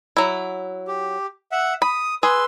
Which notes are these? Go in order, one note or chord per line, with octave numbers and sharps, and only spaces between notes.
F#3 E4
G4
E5 F#5
B5 D#6
G#4 B4 C6 E6